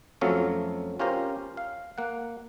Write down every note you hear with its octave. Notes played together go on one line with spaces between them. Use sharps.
F2 F#3 A3 C#4 A4 F5
C#4 F4 G4 A#4 C5
F5
A#3 F#5